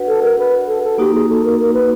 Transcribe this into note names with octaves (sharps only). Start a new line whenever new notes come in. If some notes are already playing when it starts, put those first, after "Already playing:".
Already playing: D4 F#4 B4 D5 F#5
A4
A#4
B4
A4
A4
A#3 D#4 F#4 G4
G#4
A4
A#4
A#4
B4